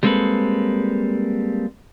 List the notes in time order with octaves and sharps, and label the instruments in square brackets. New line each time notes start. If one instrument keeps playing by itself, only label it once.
[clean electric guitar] G3 G#3 A#3 C4 A4 B4